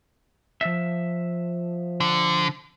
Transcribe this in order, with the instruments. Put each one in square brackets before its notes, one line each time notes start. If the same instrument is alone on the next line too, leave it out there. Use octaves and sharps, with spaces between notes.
[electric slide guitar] F3 E5
[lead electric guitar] D3